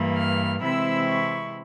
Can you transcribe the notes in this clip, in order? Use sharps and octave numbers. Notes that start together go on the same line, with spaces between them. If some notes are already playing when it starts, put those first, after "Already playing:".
Already playing: G2 E3 A#3
F6
C3 E3 G#3 C4 E4 E6
C#6